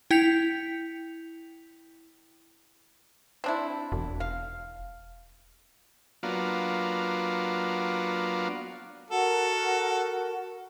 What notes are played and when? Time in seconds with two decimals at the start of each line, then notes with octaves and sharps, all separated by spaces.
0.11 E4 G5 G6 B6 C#7 F7
3.44 C4 D4 E4
3.92 E1
4.20 F5
6.23 F#3 A#3 B3 D4 F4
9.11 F#4 A4 A#4 F#5